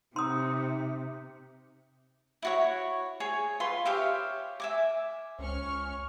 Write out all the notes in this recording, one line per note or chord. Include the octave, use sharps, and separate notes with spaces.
C3 D#4 C6 D#6
E4 F#4 C#5
G#4 C#5 G#5
F4 B4 C6 C#6
G4 C#5 E5 F5
E5 G#5 D6
C#2 C#4 C#6 F6